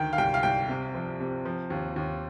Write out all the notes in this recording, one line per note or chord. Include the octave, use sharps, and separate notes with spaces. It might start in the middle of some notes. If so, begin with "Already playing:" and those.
Already playing: D2 D#3 G5
F5
C2 G5
F5
C2 G5
C3
F3
C3
F3
D#2
D#2